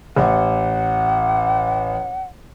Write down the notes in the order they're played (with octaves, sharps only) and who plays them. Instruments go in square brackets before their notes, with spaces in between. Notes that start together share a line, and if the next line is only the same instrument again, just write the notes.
[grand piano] A1 [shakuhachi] F#5